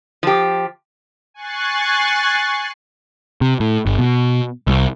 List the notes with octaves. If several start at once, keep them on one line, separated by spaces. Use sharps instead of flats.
F3 G4
G#5 C#6 F#6 A6 C7
C3
A2
G1
B2
C2